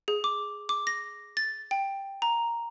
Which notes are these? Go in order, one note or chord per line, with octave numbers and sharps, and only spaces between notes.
G#4
D6
D6
A#6
A6
G5
A#5